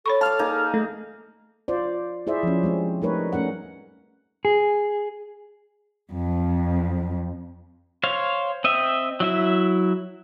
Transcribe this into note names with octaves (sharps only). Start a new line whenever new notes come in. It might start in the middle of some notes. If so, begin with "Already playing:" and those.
A4 C#5 B5 C#6
F5 A5 D6 F6
A#3 D#4 G#4
A3
F4 C5 D5
E4 G#4 C5 D5 E5
F3 C#4
G3 G#3 C4
G3 A3 D#4 A#4 B4 C#5
A3 C#4 A#4 F#5
G#4
F2
C5 C#5 F5
C4 D#5 E5
F#3 E4 E5